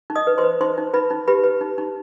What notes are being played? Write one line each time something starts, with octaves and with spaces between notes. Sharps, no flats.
D#4
D#5 D#6
B4
C5 C6
B4
D#4 C5 C6
D#4
D#4 B4 B5
D#4
G4 B4 B5
B4
D#4
D#4